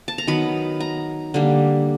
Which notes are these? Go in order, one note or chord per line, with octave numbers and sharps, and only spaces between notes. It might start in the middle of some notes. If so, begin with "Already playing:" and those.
A5
A#5
D#3 F#3 B3 B5
A#5
D3 G3 A#3